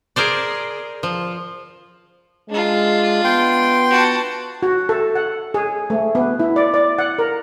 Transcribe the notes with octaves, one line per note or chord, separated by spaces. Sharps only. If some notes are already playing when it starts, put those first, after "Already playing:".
G#4 A#4 C5 D5
F3
G#3 D4 F4
B3 G5 C6
F#4 A5
F#4
A4
F#5
G#4
A3
B3
E4
D5
D5
F#5
A#4